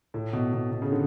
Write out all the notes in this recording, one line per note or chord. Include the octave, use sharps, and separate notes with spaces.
A2
B2
B2
B2
C#3
D3